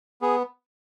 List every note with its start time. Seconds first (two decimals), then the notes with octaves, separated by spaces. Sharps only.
0.22 B3 G#4